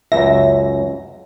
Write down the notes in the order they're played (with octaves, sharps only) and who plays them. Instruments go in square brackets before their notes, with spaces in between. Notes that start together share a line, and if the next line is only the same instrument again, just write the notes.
[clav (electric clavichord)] C#2 F#2 [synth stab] E5 A#6